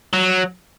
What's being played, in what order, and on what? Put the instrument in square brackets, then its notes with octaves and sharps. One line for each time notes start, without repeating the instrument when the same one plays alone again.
[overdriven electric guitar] F#3